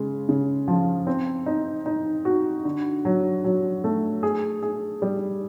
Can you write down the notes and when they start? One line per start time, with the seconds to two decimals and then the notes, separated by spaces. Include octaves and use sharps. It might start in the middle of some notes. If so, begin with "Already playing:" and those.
Already playing: C#3 G#3
0.29 C#3
0.68 F3
1.07 C4
1.46 D#4
1.86 D#4
2.25 F#4
2.65 D3
3.05 F#3
3.44 F#3
3.84 A3
4.23 G#4
4.63 G#4
5.02 G3